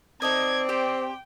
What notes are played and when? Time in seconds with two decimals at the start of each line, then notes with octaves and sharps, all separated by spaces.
0.22 C4 D#4 A4 D5 D#5 G#6
0.69 G4 C5 G5